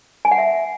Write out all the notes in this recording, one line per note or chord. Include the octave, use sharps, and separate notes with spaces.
G#5
F#5
E5